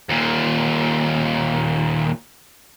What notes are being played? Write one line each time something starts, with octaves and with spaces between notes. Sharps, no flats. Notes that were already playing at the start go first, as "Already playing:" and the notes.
D#2 A#2